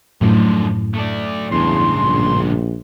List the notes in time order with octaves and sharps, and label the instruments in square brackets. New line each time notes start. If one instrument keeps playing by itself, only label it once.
[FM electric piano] F#2 A2 [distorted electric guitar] D3 F3
[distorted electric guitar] A3 D5
[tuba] E2 [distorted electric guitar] G2 C#3 [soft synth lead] C6
[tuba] A#1